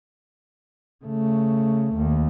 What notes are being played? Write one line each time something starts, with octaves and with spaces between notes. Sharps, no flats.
C#3 A3
D#2